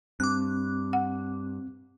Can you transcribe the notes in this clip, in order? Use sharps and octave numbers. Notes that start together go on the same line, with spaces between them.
G2 C4 D6 F#6
F#5